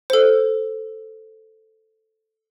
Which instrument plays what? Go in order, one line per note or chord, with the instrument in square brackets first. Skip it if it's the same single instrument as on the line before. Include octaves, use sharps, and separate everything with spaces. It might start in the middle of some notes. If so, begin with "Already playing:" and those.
[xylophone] A4 C5